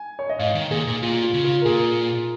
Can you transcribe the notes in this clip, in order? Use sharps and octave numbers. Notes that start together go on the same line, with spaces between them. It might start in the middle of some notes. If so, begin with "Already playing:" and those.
Already playing: G#5
C#5
D#5
G#2 F5
D#3
A#2 G#4
A#2
A#2 F4
F4
C#3
F4
A#4
A#2 G#4